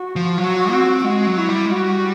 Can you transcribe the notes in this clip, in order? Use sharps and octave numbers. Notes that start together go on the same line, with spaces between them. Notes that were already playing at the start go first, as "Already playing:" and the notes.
Already playing: F#4
F3
F#3 F#4
C4 F#4
G#3 F#4
F#3
E4
G3
G#3
G3 F#4